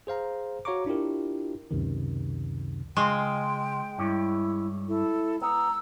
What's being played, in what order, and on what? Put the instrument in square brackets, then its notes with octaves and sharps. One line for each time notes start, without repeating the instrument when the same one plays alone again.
[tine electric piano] G#4 C5 F5 A#5
F#4 C#5 F5 A#5 C#6 D6
D4 E4 F4 G4 A#4
C#2 F#2 C3 D#3
[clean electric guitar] C#3 F4 C6 [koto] G#3 [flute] G5
[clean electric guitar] G2 C#4 [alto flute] E4
[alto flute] E4 [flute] A4
[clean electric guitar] B3 [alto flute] A#5 [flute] E6